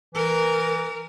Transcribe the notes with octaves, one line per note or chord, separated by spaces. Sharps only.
E3 A#4